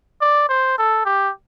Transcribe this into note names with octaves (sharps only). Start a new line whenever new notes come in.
D5
C5
A4
G4